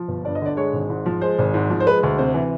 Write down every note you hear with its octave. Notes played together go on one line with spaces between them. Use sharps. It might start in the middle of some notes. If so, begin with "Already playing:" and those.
Already playing: F3
G1
G2 D5
D#5
D3 D5
G#3 C#5
G#1
G#2
F3
G#3 C5
G#1
G#2
F3
C5
G#3 B4
D2
C3 C5
E3